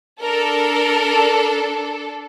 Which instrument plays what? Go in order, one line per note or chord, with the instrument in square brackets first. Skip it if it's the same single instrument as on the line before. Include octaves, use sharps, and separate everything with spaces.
[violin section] D4 A4 A#4